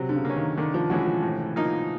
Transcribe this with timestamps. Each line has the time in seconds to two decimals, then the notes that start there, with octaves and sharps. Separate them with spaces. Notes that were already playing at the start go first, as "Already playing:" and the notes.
Already playing: C3 F#3
0.09 D3
0.15 C#3
0.25 A#3 C#4
0.36 D#3
0.57 D3 D#3
0.74 F3
0.90 E3 F3 G#3 C#4 F#4
1.06 F3
1.23 A2
1.56 F3 A#3 D#4